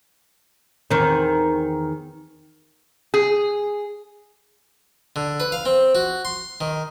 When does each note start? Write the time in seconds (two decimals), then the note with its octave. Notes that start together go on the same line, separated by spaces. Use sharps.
0.91 E2 D#3 C4
3.14 G#4
5.16 D3
5.40 B4
5.52 F5
5.65 C4
5.95 F#4
6.25 C6
6.61 D#3